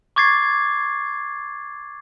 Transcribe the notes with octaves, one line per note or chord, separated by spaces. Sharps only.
C#6 D6 G#6 A6 C7